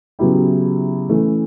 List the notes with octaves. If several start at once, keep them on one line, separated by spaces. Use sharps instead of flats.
C#3 F#3 B3 E4 G4
E3 A3 C#4